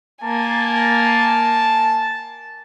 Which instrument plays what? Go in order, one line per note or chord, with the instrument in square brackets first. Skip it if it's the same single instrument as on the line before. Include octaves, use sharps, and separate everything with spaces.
[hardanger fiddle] A#3 G#5 [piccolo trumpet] A5